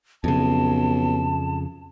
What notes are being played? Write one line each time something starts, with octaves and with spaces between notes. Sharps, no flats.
B1 F2 C#3 A5